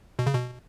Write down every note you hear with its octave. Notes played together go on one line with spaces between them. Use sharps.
B2
C#3
B2